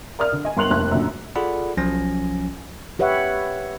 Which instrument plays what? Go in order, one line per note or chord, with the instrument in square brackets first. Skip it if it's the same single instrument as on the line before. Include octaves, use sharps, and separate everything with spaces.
[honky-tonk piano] A#4 D5 D#6 F6
D3
D#5 G#5
G1 A#4 C6 F#6 F7 F#7
F1 D#2 F#6
F#2 A#2 D3
[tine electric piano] F4 G#4 A4 D5 F#5 B5
B1 F3 F#3 C#4 G#5 A#6
[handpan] G4 B4 C#5 E5 F#5